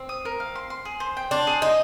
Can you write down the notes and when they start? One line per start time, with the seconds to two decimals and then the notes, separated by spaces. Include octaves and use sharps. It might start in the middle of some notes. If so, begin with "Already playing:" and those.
Already playing: C4
0.09 D#6
0.25 A#4
0.40 F5
0.55 C6
0.70 C6
0.85 G#4
1.00 C5
1.17 G5
1.31 D4 C6
1.47 G#4
1.62 D#4 C5